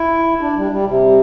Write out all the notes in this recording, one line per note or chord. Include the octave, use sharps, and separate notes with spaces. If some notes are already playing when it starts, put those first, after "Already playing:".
Already playing: E4
D4
G3
G3
C3